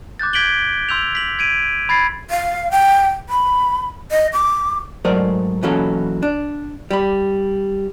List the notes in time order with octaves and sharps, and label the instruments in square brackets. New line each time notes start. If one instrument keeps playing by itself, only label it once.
[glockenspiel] D6 F#6 G6 A6
G6 G#6 B6 D7 F#7 G7
C6 E6 G6 F7
B6 F#7
G#6 D7 D#7
B5 G#6 A6 C7
[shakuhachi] F5
G5
B5
D#5
D6
[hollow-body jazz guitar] G#2 F#3 A3 A#4 C5 D5
B2 E3 F#3 A#3 C#4 A4
D4
G3 B5